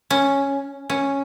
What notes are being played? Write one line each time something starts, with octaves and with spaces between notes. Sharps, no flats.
C#4
C#4